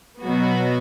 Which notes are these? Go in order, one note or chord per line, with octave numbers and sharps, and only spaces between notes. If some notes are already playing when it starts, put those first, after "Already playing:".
B2 F#3 B3 F#4